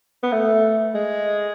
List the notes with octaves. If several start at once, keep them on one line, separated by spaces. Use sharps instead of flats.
B3
A3
G#3